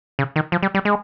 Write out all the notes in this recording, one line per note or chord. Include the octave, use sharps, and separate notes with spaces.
C#3
D#3
F3
G3
G3
G#3